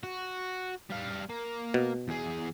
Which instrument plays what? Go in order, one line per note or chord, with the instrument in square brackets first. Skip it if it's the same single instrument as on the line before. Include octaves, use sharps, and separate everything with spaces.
[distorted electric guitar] F#4
G3 F5
A#3
[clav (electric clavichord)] B2
[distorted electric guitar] E2 G#4